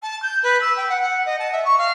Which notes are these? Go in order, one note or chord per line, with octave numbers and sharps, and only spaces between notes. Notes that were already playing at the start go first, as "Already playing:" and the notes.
A5
G6
B4
E6
G5
F#5
F#5
D#5
A5
E5
C#6
F5